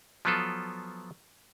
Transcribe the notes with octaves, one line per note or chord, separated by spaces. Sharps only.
F3 F#3 B3 F4 A4